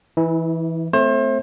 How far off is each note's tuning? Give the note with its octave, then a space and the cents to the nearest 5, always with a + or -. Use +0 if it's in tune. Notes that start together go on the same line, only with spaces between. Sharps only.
E3 +0 E4 -35
A3 +0 C4 -35 C5 +35